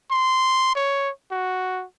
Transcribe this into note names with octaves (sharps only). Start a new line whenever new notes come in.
C6
C#5
F#4